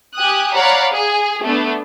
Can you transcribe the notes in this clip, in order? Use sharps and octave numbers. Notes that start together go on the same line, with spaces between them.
G4 G#5 D#6 F#6
C#5 D5 F5 F#5 A#5 B5
G#4
A3 B3 D4